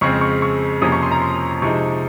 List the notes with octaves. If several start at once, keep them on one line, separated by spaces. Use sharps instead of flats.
F2 C#3 G#3 C4 C#6
C#6
C#6
F2 C3 F3 A#3 C#4 D#6
C#6
C6
A#5
C6
C3 F3 G#3 D#4 C#6